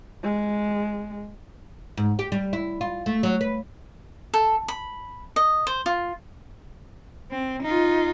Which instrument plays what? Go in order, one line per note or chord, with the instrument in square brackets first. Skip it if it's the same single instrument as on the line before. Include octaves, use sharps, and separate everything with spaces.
[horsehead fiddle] G#3
[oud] G#2
G4
G3
E4
F4
A3
F#3
B4
[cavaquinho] A4
B5
D#5
C5
F4
[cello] C4
D#4 F4